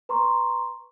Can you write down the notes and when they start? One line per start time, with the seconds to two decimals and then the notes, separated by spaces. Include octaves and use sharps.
0.09 B4 A#5 C6 C#6